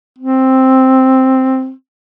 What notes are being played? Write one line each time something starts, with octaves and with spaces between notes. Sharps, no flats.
C4